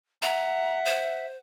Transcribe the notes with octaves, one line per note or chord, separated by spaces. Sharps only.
E5 F#5 A#5
C5